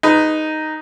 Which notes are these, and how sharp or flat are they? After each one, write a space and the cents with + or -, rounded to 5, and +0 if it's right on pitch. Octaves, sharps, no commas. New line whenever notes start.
D#4 +0 G#4 +5 B4 +20